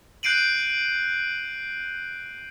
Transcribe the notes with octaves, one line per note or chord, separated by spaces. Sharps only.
F#6 G6 C7 D7 D#7 F#7